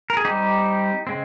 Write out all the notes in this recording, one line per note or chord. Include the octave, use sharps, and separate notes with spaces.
A#4
G#4
G3 C4 D#4 G4
C#3 G#3 C4